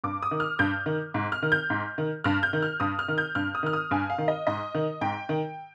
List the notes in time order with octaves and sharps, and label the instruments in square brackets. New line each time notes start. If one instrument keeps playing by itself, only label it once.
[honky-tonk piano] G2 D6
D#6
D#3
F6
G2 G6
D#3
G#2
F6
D#3
G6
G#2
D#3
G2 F6
G6
D#3
F6
G2 D#6
F6
D#3
G6
G2 F6
D#6
D#3 F6
D#6
G2 G#5
F5
D#3
D#5
G#2 D#5
D#3
G#2 G5
D#3